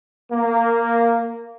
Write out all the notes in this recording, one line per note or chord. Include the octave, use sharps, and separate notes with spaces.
A#3